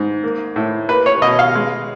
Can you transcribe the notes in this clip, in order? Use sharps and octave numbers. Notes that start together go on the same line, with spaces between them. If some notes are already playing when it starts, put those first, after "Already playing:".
Already playing: G#2
A#3
A2
A#3 B4
C#5
B2 D#5
F5
G#3